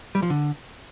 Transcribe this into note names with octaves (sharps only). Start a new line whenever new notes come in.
G3
F3
D3